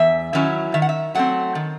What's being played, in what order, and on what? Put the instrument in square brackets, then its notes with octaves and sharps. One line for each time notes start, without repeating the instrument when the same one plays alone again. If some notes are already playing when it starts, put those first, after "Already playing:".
Already playing: [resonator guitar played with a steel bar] E2 E5
D#3 F#3 C#4 E4 E5
D#3 E5
F#5
E5
F#3 A3 C4 F#5
D#3